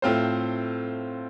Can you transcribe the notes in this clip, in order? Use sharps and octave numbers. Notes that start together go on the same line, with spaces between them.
A2 A3 C4 F4 C5